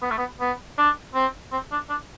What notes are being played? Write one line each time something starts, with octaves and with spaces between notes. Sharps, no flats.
B3
A3
B3
B3
D4
C4
C4
D4
D4